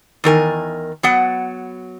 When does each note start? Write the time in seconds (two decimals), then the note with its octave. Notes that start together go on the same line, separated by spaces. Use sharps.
0.24 E2 D#3 A#4 G#5
1.03 F#3 B3 F#5